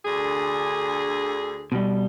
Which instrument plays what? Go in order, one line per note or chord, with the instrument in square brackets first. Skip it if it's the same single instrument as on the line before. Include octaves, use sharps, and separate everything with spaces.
[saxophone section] D2 D3 G#4
[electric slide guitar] B2 G3